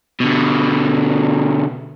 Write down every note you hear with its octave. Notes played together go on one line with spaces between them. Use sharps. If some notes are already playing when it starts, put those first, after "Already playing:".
B2 D3